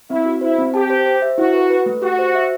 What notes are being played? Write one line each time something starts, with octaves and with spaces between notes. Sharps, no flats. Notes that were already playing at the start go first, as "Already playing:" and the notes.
C4 E4
F#4
E4 C5
C4
G4 A5
C5
C5
E5
E4 F#4
B4
B4
A3
F#4 G4
C5
E5